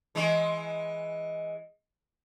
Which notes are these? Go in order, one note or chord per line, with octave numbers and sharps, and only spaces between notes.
E3 G#3